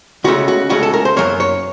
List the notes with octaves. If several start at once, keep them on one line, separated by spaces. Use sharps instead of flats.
C#2 C#3 A3 F#4
F#4
C#2 C#3 A3 F#4
A4
A#4
C5
F#2 C#3 F#3 A#3 C#5
C#5